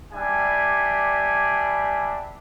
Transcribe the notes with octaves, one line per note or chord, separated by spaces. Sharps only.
G3 D4 E5 G#5